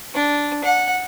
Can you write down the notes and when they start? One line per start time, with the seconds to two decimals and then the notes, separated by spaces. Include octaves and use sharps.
0.14 D4
0.64 F#5